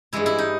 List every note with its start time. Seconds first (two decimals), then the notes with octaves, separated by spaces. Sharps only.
0.13 G2 E3 G#3 E4
0.26 E4
0.38 D#4